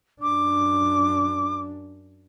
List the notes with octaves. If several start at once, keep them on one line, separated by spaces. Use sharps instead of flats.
F#2 D4 D6